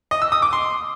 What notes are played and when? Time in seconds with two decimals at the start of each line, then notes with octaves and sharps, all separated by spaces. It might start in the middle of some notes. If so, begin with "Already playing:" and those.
0.11 D#5
0.22 E6
0.32 D#6
0.42 D6
0.53 C6